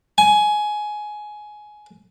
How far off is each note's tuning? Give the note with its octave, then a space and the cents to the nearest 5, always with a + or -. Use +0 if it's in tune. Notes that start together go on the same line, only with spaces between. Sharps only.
G#5 +15